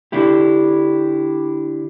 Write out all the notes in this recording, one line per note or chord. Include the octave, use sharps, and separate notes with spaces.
D3 D4 E4 G4